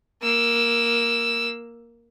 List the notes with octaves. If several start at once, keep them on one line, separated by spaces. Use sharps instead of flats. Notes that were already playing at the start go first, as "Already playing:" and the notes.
A#3 E6